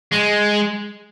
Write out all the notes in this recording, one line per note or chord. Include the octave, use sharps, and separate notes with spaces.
G#3